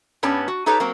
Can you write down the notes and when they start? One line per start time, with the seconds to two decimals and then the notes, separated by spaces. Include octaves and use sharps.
0.23 G2 G3 B3 C#4 A5
0.48 F#4
0.66 D#4 G4 A4 B4 C#5
0.80 F#3 A#3 C4